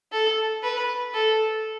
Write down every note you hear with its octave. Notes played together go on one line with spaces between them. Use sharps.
A4
B4
A4